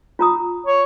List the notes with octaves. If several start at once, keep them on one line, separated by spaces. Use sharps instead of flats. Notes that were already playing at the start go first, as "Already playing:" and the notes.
F4 A#5 D#6
C#5